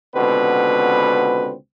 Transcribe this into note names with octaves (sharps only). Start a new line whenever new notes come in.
C#2 B2 D3 C4 B4